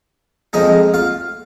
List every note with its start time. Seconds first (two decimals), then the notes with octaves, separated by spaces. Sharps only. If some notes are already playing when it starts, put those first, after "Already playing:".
0.53 F2 F3 G#3 D#4 D#5
0.94 F4 F5